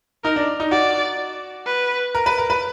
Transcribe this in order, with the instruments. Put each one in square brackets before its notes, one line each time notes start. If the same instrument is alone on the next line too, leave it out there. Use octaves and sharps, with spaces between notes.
[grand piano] D#4 [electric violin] A#4
[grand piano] D4
D#4
[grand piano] F#4 [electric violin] D5
[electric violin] B4
[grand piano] A#4
B4
A#4
B4